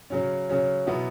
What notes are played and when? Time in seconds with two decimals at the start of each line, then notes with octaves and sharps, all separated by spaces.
0.10 C#3 F#3 C#4
0.49 C#3 F#3 C#4
0.87 B2 F#3 B3 E4